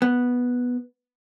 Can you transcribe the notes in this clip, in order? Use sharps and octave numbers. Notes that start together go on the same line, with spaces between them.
B3